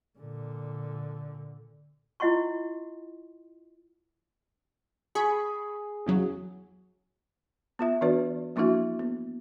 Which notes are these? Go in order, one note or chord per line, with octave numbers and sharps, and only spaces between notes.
A#2 D3
E4 F4 D#5 F#5 C6 C#6
G#4 B5 C#6
E2 C#3 F#3
B3 F4 E5
E3 B3 D4 F#4 B4 D5
F3 A#3 D4 E4 F#4 E5
B3